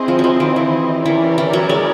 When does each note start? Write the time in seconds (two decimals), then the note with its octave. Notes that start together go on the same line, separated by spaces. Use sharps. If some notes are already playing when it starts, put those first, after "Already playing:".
Already playing: C4 E4 G#4 C5 D#5
0.08 F3
0.19 F#3
0.24 F3
0.40 D#3
0.56 E3
1.05 E3 C#4 E4 G4 A#4 D5
1.38 E3
1.53 F#3
1.69 G#3